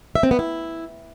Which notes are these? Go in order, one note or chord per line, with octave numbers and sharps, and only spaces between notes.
E5
C4
B3
E4